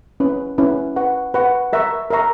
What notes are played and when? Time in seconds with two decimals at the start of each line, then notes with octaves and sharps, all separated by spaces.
0.20 C#4 E4 B4
0.58 C#4 E4 B4
0.96 B4 F#5 C#6
1.34 B4 F#5 C#6
1.73 A#4 E5 A#5 C#6
2.10 A#4 E5 A#5 C#6